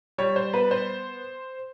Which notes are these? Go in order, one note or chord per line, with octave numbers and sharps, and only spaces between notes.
G3 C#5
C5
B3 B4
C5